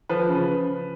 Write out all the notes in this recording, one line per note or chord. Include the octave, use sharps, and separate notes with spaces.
F3 B4
C#3